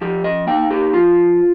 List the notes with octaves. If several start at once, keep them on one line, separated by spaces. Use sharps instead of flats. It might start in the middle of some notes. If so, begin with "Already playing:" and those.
F3 G4
D#5
A#3 D#4 G5
G4
F3 F4